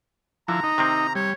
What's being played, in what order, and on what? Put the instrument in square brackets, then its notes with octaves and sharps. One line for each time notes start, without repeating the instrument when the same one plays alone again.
[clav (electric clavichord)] D3 [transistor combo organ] F3 E4 [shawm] A#5
[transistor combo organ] D#4
[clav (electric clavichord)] C3 D#3 C4
[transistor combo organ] G3 [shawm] C#5